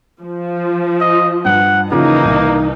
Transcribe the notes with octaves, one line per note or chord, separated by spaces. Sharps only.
F3
D#5
G2 F#5
C#3 E3 F3 A#3 D#4
C2